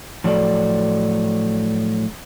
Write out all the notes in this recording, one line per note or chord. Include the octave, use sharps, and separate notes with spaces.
A2 F3 F#3 A4 D5